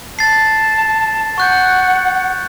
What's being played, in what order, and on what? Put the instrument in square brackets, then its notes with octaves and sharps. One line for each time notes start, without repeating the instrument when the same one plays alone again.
[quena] A5 [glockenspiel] A6 C7
[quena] F#5 [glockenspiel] C#6 F#6 G6